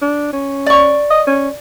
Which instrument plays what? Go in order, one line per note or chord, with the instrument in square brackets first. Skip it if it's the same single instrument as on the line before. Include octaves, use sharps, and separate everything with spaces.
[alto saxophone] D4
C#4
[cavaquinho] D5 C#6
[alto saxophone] D#5
C#4